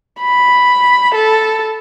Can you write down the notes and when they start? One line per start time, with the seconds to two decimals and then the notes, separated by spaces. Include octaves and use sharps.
0.20 B5
1.15 A4